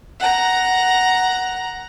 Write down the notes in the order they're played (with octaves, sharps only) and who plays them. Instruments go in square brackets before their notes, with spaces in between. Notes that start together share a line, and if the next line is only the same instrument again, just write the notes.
[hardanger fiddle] F#5 A#5